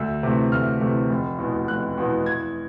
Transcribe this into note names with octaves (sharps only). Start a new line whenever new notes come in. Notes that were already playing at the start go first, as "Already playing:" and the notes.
Already playing: D2 E6
C3 E3 A3
D2 F6
C3 E3 A3
F1
E2 B2
F1 F#6
E2 B2
E2 G#6